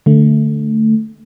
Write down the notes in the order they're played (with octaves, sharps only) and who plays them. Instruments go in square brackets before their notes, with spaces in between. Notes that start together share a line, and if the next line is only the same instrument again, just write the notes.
[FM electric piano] D3 A3